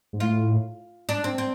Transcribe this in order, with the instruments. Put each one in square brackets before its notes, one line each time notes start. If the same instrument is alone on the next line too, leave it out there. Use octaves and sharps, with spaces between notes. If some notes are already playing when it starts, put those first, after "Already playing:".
[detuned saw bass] G#2
[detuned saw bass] A2 [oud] F4
[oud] D4
C4
C4